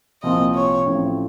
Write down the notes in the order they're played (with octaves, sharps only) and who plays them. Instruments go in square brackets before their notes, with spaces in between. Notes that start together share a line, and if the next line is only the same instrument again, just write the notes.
[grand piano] C2 A#2 F3 C4 [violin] D#5
[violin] C#5
[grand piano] A1 A2 F3 C4